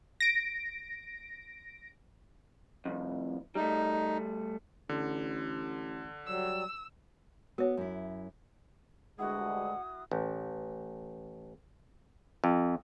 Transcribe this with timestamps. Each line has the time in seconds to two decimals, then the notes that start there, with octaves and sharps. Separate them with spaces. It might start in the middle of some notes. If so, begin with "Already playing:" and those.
0.20 A#6 D7
2.85 C2 F2
3.55 G3 A3 D#4
4.89 A1 D3
6.26 F#3 G3 E6
7.58 B3 F#4 C#5
7.77 F#2 E4
9.19 D2 G2 G#3 E4 F#4 F#5 D#6
10.11 A1
12.44 F2